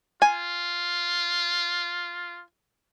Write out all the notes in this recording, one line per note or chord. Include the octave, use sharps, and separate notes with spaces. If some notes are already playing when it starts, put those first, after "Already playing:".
F4 G#5